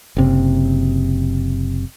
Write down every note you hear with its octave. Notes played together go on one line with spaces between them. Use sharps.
F#1 C3